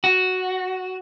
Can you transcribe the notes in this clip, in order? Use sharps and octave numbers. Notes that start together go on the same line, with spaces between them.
F#4